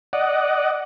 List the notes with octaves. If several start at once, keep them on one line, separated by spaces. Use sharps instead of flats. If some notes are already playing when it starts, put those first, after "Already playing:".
D5 D#5 F#5